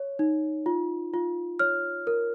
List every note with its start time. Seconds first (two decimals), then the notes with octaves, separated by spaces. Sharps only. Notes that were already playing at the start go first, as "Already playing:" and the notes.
Already playing: C#5
0.19 D#4
0.66 F4
1.14 F4
1.59 C#5 F6
2.07 A#4